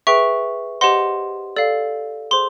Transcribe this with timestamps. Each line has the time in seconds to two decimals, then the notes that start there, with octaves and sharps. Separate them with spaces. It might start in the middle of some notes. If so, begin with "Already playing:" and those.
0.07 G#4 B4 E5 G5 C#6
0.81 G4 C5 D#5 F#5 C6
1.56 A4 D5 F5
2.31 G#4 C5 C6